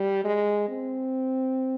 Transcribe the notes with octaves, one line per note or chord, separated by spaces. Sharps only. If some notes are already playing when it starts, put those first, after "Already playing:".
Already playing: G3
G#3
C4